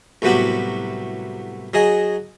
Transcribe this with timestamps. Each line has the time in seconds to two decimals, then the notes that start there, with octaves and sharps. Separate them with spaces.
0.22 C2 A2 F#3 B3 F#4 G4
1.74 F#3 G#4 D#5 G#5